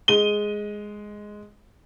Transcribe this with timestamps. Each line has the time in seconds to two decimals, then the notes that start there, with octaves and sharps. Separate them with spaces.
0.08 G#3 D#7 G7